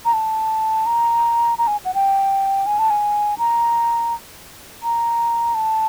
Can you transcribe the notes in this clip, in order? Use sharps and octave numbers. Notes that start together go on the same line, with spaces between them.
A#5
A5
A#5
A#5
G#5
F#5
G5
G#5
A5
G#5
A#5
A#5
A5